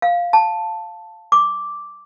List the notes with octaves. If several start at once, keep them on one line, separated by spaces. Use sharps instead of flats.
F5
A5
D6